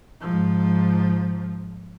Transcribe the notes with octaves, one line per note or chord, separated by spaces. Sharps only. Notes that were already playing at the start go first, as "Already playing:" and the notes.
G#2 F3